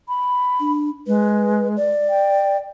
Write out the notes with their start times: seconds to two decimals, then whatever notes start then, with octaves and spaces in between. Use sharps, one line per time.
0.09 B5
0.60 D4
1.07 G#3 B4
1.77 D5
2.09 G5